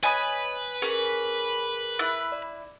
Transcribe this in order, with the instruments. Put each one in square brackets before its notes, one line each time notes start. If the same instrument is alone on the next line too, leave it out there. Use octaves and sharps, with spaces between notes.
[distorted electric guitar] B4 [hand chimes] C#5 D#5 D#6 [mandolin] G#5 B5
[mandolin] C#4 [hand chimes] G#4 A#4 G#5
[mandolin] E4 F#6
[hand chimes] D5